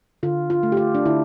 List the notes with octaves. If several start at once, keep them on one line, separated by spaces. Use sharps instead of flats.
D3 F4
F4
A3
G4
F4
D4
D3 E4